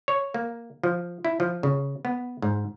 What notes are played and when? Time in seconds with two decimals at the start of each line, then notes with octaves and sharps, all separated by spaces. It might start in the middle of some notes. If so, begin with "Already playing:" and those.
0.08 C#5
0.34 A#3
0.84 F3
1.25 E4
1.40 F3
1.63 C#3
2.05 B3
2.42 G#2